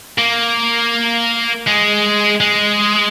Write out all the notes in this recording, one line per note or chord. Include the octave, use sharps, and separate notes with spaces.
A#3
G#3
G#3